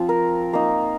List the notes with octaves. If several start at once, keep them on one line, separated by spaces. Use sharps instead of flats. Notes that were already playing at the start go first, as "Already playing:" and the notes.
Already playing: F3 C4 F4
A#4
A#3 D#4